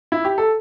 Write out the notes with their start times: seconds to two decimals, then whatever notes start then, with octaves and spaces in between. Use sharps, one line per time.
0.12 E4
0.25 G4
0.38 A4